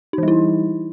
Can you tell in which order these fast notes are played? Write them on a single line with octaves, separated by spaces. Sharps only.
D#4 E3 G3 E4